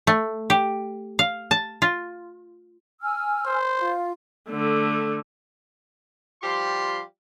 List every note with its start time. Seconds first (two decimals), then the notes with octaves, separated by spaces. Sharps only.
0.07 A3
0.50 G4
1.19 F5
1.51 A5
1.82 F4
3.02 G#5 E6 F6
3.46 C5
3.78 F4
4.50 D3 A3
6.42 F3 G3 F4 G4 C6